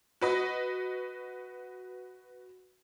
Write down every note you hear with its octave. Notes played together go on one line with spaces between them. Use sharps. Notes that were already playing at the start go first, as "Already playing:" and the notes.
F#4 B4 D#5